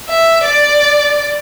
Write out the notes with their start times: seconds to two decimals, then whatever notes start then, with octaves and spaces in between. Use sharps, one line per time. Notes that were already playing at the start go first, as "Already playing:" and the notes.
0.09 E5
0.46 D5